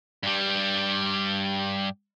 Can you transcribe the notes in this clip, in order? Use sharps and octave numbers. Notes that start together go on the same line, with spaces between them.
G2 G3